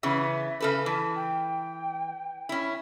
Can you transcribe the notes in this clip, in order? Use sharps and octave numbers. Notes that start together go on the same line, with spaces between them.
C#3 E3 B3 E5
C#3 A4 B4
E3 A5
G5
C#4 E4